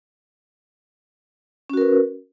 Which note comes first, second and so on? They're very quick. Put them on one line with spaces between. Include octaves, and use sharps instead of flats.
C#4 F#4 A#4 B4